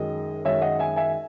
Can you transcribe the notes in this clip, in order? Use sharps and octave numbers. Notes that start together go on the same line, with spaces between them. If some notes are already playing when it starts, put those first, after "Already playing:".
Already playing: F#2 D#3 G#3 D#5
F#2 D#3 G#3 C#5 E5
D#5 F#5
E5 G#5
E5 G#5